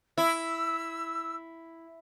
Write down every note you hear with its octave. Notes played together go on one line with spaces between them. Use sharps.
E4 E6